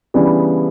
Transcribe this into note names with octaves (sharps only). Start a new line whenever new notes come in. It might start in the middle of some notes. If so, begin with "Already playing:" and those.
C#3 E3 G3 B3 D4